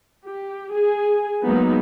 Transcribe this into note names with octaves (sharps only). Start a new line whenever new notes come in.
G4
G#4 G#5
F#3 G#3 A#3 B3 D#4